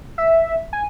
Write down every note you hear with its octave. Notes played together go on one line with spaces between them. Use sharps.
E5
G#5